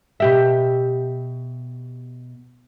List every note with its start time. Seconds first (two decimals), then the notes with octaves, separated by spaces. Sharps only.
0.20 B2 G4 E5